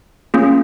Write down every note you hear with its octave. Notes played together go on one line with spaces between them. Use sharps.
A#3 C#4 F4 G#4